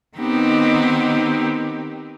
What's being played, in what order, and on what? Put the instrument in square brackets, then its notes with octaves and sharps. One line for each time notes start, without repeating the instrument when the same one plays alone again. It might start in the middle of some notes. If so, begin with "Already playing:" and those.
[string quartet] D#3 B3 C4 D#4 G4